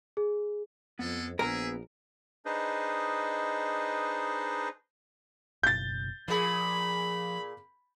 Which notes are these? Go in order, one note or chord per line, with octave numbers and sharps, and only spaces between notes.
G#4
F2 G#3 B3 A4
A#1 B3 G#4 A#4 B4 E5 G#5
D4 D#4 G#4 B4 C5 D#5
F#1 B2 G6 A6
A#2 F3 G#4 B5